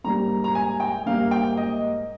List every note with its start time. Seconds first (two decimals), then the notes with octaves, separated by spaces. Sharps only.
0.04 G#2 G3 A#3 A#5
0.44 A#5
0.55 G#5
0.80 G5
1.06 G#2 G3 A#3 F5
1.31 G5
1.57 D#5